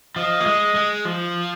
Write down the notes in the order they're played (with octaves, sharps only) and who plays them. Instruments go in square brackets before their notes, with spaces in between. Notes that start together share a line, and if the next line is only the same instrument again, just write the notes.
[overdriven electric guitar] F3 [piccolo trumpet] D#5
[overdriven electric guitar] A#3
G#3
G#3
F3